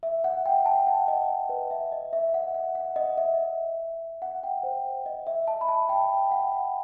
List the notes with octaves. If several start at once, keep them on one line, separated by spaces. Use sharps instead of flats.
E5
F#5
G5
A5
F#5
D#5
B4
E5
D#5
E5
F#5
F#5
F#5
D#5
E5
F#5
G5
C5
D#5
E5
A5
B5
A5
G5
F#5